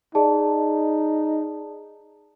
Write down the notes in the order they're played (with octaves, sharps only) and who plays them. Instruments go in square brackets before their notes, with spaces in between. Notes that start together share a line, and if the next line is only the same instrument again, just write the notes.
[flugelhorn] D#4 [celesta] G#4 D5 A5